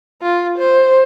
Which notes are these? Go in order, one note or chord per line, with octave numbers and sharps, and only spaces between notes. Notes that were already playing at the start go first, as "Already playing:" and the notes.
F4
C5